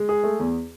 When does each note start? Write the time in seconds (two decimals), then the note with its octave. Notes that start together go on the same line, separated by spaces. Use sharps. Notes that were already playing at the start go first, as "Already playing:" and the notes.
Already playing: G#3
0.09 G#4
0.24 A3
0.40 E2